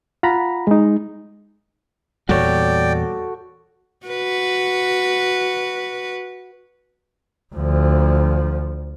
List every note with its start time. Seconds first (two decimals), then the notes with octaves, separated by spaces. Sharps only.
0.23 F4 F#5 A#5 B5
0.67 G#3 D#4
2.29 E2 A#2 G3 F#4 A4 C#5 D5 G5
4.06 F#4 B4
7.55 D2 F3